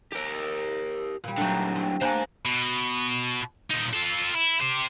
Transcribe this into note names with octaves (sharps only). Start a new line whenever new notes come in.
G4 A#4
A#2 G3
D3 F#3 D4 D#4
C4
A#3 D4 B4 C5 G#5
B2
A#2 D#4
F4 A4
E4
G4 C5